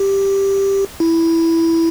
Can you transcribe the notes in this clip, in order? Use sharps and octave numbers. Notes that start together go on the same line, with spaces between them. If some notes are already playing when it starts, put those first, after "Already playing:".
Already playing: G4
E4